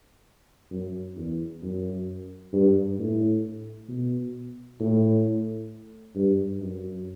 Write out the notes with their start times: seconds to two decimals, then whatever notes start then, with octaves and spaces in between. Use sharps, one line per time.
0.71 F#2
1.16 E2
1.62 F#2
2.53 G2
2.99 A2
3.88 B2
4.80 A2
6.15 G2
6.61 F#2